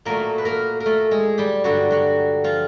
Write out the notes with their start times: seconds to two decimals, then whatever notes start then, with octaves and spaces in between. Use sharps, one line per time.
0.05 A#2 F#3 A3 A#3 A#4
0.38 B4
0.45 A#3 A#4
0.80 A#4
0.86 A3 A4
1.11 G#3 G#4
1.38 G3 G4
1.64 G2 D3 F#3 G3 F#4
1.91 F#3 F#4
2.44 F3 F4